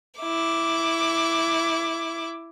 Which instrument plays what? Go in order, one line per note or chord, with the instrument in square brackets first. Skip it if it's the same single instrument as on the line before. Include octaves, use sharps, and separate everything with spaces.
[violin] E4 D6